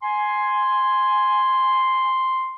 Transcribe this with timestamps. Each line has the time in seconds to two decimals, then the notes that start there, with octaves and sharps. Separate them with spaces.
0.02 G#5 C6